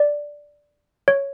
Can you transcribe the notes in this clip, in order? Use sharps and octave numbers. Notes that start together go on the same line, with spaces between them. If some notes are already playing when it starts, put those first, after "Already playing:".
Already playing: D5
C#5